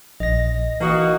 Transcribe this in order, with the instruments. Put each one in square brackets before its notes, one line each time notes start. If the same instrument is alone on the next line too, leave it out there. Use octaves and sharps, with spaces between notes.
[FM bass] A#1 [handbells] D#5 A#6
[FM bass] E3 [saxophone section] A#3 D#4 F#4